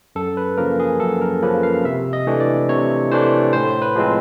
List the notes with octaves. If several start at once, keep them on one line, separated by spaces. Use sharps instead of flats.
F#2 A4
B4
C#3 F3 A#3 A#4
G#4
F#2 A4
A#4
C#3 F3 A#3 B4
F5
C3 E5
D#5
E3 A3 D4
D5
C3 C#5
E3 A3 D4 C5
A2 C5
B4
F3 G#3 C4